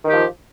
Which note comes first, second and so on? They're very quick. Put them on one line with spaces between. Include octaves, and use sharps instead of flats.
D#3 G4 F3